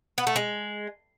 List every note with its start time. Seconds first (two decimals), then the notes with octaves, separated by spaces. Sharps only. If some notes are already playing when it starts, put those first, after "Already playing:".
0.18 B3
0.27 A3
0.36 G#3